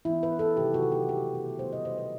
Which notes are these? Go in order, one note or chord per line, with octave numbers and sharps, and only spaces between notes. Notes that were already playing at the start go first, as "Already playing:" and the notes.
E3 B3 E4
B4
A4
C3 D#3 F#3 G4
F#4
A4
G4
B2 A3 G4
B4
D#3 G3 B3 C5
D#5
C5
B4